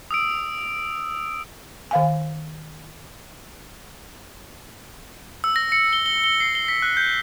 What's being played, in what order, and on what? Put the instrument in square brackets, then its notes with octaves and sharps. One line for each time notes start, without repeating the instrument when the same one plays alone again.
[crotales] D#6 E6 D7
[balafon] D#3 F5 G#5
[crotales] E6
A#6
C#7
G7
G7
G7
C7
G7
B6
F#6
G6